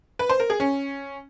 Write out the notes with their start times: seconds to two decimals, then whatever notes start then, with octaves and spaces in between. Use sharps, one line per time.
0.19 B4
0.30 C5
0.40 A#4
0.50 G#4
0.60 C#4